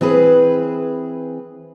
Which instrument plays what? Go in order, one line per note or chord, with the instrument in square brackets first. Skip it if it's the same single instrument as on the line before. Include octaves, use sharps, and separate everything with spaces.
[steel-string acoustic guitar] E3 C4 G#4 B4